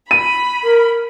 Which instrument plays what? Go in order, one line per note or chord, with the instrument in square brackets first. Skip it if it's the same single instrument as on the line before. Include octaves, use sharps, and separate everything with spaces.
[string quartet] B5 [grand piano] D#7
[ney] A#4